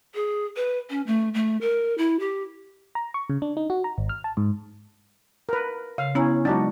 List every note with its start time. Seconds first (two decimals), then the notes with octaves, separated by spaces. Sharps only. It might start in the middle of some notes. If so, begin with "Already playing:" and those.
0.15 G#4
0.56 B4
0.90 C#4
1.07 A3
1.34 A3
1.61 A#4
1.98 E4
2.20 G4
2.95 A#5
3.14 C#6
3.30 C#3
3.42 D4
3.57 D#4
3.70 F#4
3.84 A#5
3.98 G#1
4.09 F6
4.24 A5
4.37 G#2
5.49 A#4 B4
5.98 C#3 F5
6.15 B3 C#4 E4 A#5
6.45 F#3 G#3 D4 D#4 F#4